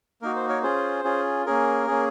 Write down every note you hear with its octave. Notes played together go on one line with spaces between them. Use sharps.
A#3 D#4 F#4 A#4
C5
A#4 C#5
C#4 F4 G#4 C5
C#4 F4 G#4
A#3 C#4 G#4 A#4
A#3 C#4 G#4